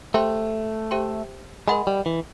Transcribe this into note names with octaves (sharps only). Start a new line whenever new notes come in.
A3 G4 C5 E5 G5 C6
G4 C5 E5 G5 C6
G#3 A#4 D#5 F#5 B5 D#6
G3
E3